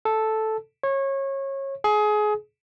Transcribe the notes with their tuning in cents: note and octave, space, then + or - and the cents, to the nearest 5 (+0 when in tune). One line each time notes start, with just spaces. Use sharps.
A4 -5
C#5 -25
G#4 +25